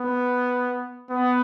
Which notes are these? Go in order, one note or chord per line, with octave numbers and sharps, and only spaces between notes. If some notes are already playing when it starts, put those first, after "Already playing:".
Already playing: B3
B3